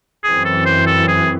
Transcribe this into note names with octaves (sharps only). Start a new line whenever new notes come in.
F#2 E3 C4 G#4
A4
C5
A4
G#4